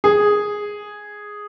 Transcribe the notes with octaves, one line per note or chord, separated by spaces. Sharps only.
G#4